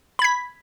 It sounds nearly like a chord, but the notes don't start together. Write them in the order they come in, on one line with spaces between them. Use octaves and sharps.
B5 G#6 B6